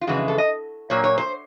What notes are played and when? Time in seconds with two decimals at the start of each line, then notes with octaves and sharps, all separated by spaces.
0.01 F4
0.07 F2 C#3 E3 G#3 F#4
0.28 A4
0.38 D#5
0.90 A#2 F#3 A#3 C#5
1.04 C#5
1.18 C5